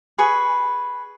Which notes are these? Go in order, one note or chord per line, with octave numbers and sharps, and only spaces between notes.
G#4 B4 C#6